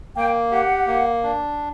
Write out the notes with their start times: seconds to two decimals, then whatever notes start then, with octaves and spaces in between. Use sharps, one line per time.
0.16 A#3 G5
0.51 G4 F#5
0.87 A#3
1.23 D4